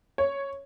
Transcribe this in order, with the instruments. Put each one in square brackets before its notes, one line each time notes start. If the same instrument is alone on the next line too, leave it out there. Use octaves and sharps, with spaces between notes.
[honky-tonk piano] C#5